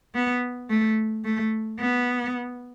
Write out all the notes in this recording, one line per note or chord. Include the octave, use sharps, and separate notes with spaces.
B3
A3
A3
B3